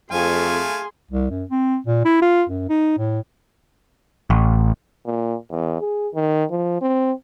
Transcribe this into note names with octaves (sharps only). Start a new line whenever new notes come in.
F2 A3 G#4 F5 G#5 C6
C2
F#2
C4
A#2
E4
F4
F#2
D#4
A2
A1
A#2
E2
G#4
D#3
F3
C4